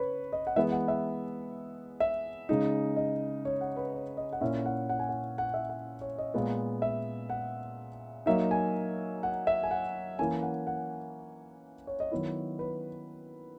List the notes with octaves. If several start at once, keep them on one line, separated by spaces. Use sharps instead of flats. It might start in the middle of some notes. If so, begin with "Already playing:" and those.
Already playing: C#3 B4 C#5
D#5
F#5
E3 G#3 B3 E5
F#5
E5
E5
C#3 G#3 D#4
D#5
C#5
F#5
B4
C#5
D#5
F#5
A#2 A#3 C#4 E4 E5
F#5
F#5
G#5
F#5
F#5
E5
F#5
C#5
D#5
A#2 G#3 B3
E5
F#5
F#3 A#3 D#4 E5
G#5
F#5
E5
G#5
F#5
E3 A#3 C#4 G#5
F#5
F#5
C#5
D#5
D#3 F#3 B3 E4 C#5
B4